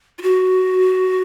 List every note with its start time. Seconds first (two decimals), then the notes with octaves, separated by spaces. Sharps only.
0.19 F4
0.22 F#4